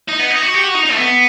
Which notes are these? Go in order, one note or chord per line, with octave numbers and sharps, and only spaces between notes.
D#4
B3
D#4
F#4
G4
F#4
D#4
D#4
A3
B3